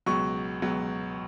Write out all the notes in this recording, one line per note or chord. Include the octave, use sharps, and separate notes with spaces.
C#2 B2 F#3 C#6
C#2 B2 F#3